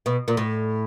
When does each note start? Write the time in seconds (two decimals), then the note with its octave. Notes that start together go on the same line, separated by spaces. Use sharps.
0.06 B2
0.28 A#2
0.37 A2